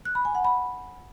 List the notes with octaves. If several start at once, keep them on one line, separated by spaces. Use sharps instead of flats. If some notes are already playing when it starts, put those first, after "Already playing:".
F#6
B5
G#5
F#5
B5